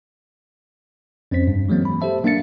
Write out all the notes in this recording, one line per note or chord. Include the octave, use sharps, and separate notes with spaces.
F2 C4 C#4 C5 B6
G2
E3 F#3 G#3 A#3 C4
B5
G4 A4 C5 E5 A5
F#3 A#3 D4 F5 A6 C#7